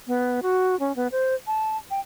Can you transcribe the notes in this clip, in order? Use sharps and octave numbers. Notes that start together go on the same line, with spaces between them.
B3
F#4
C#4
B3
C5
A5
G5